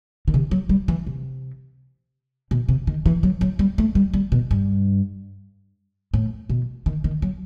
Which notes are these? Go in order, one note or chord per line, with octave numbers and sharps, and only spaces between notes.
D#3
C3
F#3
G3
E3
C3
B2
C3
D#3
E3
F#3
F#3
G3
A3
G3
G3
B2
G2
A2
B2
D#3
D#3
F#3